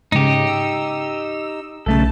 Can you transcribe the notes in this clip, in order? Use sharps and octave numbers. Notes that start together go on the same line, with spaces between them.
G#2 C#3 D#4 G4
E6
B1 C#3 A3 A4 A5